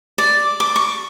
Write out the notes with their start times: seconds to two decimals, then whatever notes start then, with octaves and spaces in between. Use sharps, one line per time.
0.18 D5
0.60 D6
0.76 C#6